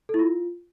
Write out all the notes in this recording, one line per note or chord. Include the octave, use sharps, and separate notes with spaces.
A4
E4
F4